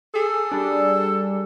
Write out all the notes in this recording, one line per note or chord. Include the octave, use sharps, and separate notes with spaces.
G#4 A4
G3 D4